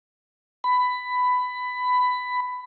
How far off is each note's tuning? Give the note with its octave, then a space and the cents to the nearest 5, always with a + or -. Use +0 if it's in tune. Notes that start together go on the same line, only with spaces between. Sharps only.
B5 +15